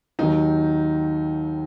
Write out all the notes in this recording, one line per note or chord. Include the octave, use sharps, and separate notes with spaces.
D#2 D#3 F#3 D#4